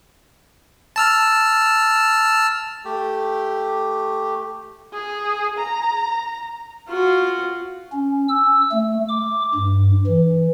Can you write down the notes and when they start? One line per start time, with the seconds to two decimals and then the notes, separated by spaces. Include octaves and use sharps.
0.96 A5 E6 F6
2.85 A3 G4
4.93 G#4
5.58 A#5
6.88 F4 F#4
7.92 C#4
8.28 E6
8.71 A3
9.09 D6
9.54 G2
10.06 E3